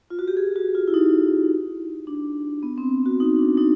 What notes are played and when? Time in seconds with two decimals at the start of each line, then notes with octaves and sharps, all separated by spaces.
0.10 F4
0.19 F#4
0.28 G4
0.37 G#4
0.56 F#4
0.75 F4
0.88 E4
0.94 D#4
2.07 D4
2.63 B3
2.78 C4
3.06 F#4
3.20 D#4
3.39 D4
3.57 D#4